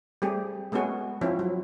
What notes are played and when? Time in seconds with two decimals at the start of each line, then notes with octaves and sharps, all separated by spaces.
0.22 G3 A3 C4 G4 G#4
0.72 G#3 A3 B3 C#4 F#4 G#4
1.21 F3 C4 C#4 E4
1.39 F#3